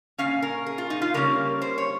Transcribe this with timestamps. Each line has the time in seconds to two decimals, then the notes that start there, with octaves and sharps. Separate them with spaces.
0.18 A#2 G3 C#4 F5
0.42 A#4
0.66 G#4
0.78 F4
0.90 D#4
1.02 F4
1.14 C#3 G3 A#3 C#4 A#4
1.62 C5
1.78 C#5